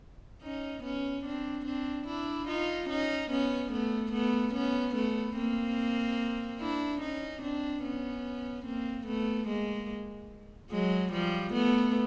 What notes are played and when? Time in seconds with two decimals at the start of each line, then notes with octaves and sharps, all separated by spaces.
0.43 C#4 D#4
0.84 B3 C#4
1.24 C4 D4
1.66 C4 D4
2.07 D4 E4
2.48 D#4 F4
2.89 C#4 D#4
3.30 B3 C#4
3.72 A3 B3
4.12 A3 B3
4.54 B3 C#4
4.95 A3 B3
5.36 A#3 C4
6.60 D4 E4
7.01 C#4 D#4
7.42 C4 D4
7.83 B3 C#4
8.65 A#3 C4
9.06 A3 B3
9.48 G#3 A#3
10.71 F#3 G#3
11.12 F3 G3
11.53 A3 B3